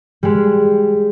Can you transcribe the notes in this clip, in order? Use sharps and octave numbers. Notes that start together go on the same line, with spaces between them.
G3 G#3